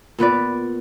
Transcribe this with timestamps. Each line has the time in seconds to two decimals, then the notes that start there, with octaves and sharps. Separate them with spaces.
0.19 A#2 B3 B4 D5